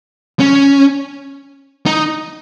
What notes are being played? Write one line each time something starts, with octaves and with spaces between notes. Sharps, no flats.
C#4
D#4